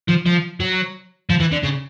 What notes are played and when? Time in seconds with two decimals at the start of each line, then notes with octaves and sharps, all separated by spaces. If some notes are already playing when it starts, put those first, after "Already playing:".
0.08 F3
0.26 F3
0.60 F#3
1.30 F3
1.40 E3
1.52 D3
1.63 C#3